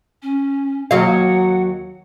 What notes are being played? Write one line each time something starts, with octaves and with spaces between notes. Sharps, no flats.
C#4
D#2 F#3 F5 F#5